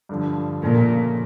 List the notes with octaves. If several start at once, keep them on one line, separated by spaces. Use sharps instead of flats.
G2 D3 F3
A#2 C#3 F3 A3 C#4